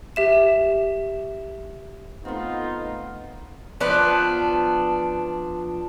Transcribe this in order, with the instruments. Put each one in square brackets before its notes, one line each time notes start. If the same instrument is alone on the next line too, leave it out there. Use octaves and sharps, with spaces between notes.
[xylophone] G4 E5 E7
[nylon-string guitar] A3 C4 [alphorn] B3 [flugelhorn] D#4 [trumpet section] F4
[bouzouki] F3 B3 D4 B4